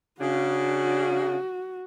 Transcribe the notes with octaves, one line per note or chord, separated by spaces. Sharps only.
C#3 D4 F#4